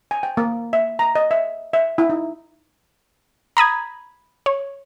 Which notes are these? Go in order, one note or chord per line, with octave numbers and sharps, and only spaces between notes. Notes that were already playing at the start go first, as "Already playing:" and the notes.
G#5
G5
A#3
E5
A#5
D#5
E5
E5
E4
D#4
A#5 B5 D#6 G#6
C#5